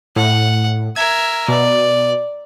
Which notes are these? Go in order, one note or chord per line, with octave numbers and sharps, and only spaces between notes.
A2 F#5
A#4 E5 G#6
B2 D5